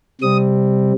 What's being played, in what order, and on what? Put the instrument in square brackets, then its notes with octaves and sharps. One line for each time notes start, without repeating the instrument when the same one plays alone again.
[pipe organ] C3 G3 C4 D#6